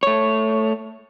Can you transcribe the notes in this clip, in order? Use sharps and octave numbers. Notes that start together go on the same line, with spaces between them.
A3 C#5